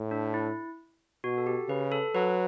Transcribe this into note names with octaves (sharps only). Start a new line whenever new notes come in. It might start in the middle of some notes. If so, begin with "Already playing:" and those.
Already playing: A2
D4
E4
B2 F#4
A4
G4
C#3 B4
A4
F#3 B4